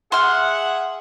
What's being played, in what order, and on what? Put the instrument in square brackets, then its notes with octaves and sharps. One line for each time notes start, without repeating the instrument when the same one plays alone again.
[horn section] G#4 E5 F#5 [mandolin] C6 F6